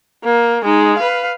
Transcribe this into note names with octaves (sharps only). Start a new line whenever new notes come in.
A#3
G#3 D#4
B4 F5